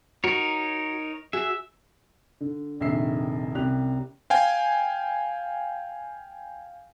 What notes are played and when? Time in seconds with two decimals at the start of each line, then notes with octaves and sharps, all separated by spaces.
0.24 D#4 F#4 A#4 C#5
1.33 F#4 G#4 E5
2.40 D3
2.80 F1 A#1 D#3 E5 E6 C7
3.55 C2 C#4 G4 F#6 F7
4.30 F5 G5 G#5